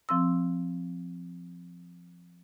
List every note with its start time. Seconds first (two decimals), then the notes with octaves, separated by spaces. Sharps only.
0.09 F3 C4 C6 E6